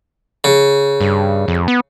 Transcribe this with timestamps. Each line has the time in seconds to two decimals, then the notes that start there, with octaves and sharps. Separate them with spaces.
0.44 C#3
1.01 G2
1.48 F2
1.68 B3